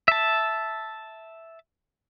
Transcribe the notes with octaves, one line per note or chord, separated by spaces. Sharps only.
E5 A5